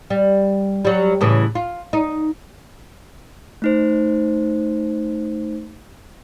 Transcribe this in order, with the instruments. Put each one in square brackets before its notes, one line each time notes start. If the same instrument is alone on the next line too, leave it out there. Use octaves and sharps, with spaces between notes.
[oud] G3
F#3 G3
A2 C#3 E3
F4
D#4
[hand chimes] A3 D#4 C5